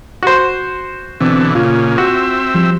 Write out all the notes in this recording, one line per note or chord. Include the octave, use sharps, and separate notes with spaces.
F#4 C5
B2 D3 E3 C4
A#2 C#3 F4
C4 F#4 E5
F3 G3